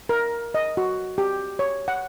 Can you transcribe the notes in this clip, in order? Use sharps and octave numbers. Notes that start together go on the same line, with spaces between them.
A#4
D#5
F#4
G4
C#5
F#5